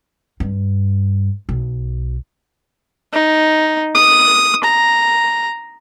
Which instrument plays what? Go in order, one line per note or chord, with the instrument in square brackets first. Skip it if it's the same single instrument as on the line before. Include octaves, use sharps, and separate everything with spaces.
[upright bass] G2
B1
[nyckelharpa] D#4
D#6
A#5